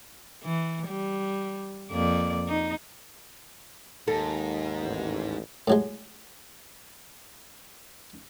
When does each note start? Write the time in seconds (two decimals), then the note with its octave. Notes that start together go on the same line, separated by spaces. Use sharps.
0.44 E3
0.88 G3
1.92 F2 A#3 D5
2.48 D#4
4.08 D#2 G#2 A4
4.83 A1
5.68 A2 F#3 G#3